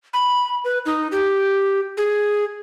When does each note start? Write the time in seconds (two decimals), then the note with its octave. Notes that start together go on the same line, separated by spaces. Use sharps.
0.13 B5
0.64 B4
0.86 D#4
1.12 G4
1.97 G#4